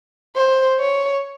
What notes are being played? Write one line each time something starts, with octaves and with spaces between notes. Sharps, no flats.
C5
C#5